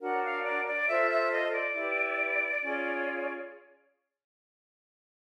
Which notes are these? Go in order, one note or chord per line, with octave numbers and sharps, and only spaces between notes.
D4 F#4 A#4 C#5 F#5
F5
D5
D5
F4 A4 C5 E5
E5
D#5
D5
E4 G4 B4
C#4 F4 G#4 C#5